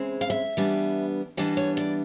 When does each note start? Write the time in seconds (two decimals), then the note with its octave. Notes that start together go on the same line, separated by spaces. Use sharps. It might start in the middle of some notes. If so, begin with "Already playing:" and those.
Already playing: C#3 E3 G#3 C4
0.21 F5
0.30 E5
0.57 E3 G3 B3 D4
1.37 E3 G3 B3 D4 D#5
1.57 C#5
1.77 D5